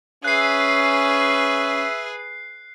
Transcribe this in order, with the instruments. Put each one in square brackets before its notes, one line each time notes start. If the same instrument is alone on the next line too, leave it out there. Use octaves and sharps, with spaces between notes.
[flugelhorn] C#4 [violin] G#4 B4 [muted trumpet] E5 [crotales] F#6 C7